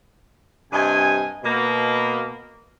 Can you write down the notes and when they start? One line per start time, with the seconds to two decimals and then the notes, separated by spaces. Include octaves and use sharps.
0.73 G2 C3 D#5 G#5
1.44 B2 A#3